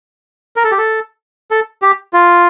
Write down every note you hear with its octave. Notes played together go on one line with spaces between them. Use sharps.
A#4
A4
G4
A4
A4
G4
F4